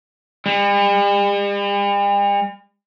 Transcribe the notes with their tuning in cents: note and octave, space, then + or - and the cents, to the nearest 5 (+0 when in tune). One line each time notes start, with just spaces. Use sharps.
G3 +45